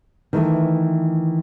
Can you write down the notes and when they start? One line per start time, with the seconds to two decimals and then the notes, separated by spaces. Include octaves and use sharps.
0.33 D#3 E3 A3